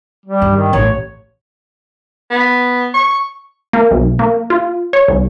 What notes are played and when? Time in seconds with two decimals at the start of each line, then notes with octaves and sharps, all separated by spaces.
0.26 G3
0.42 G2
0.56 D#3
0.73 A1 C#5
2.31 B3
2.94 C#6
3.73 A#3
3.91 B1
4.19 A#3
4.50 F4
4.93 C#5
5.08 C2